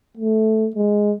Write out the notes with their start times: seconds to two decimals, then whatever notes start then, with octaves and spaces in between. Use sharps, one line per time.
0.17 A3
0.75 G#3